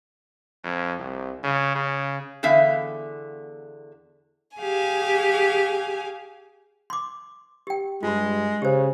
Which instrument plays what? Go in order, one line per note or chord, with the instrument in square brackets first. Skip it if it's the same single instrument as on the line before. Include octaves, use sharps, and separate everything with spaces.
[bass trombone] F2
C2
C#3
C#3
[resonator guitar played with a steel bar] E2 D3 B3 E5 F5
[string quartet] G4 G#4 F5 G#5
[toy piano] C6 D6
G4 G5
[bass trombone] G2 [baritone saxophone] G#3 [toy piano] F4 B5
[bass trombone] C#3 [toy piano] G4 C5